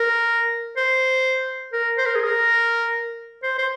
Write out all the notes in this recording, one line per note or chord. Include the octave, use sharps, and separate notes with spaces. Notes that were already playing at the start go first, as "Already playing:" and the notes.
Already playing: A#4
C5
A#4
C5
A#4
G#4
A#4
C5
C5